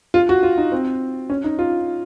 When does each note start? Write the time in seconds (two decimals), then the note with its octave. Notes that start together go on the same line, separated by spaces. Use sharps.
0.14 F4
0.29 F#4
0.43 F4
0.58 D#4
0.72 C4
1.30 C#4
1.44 D#4
1.59 F4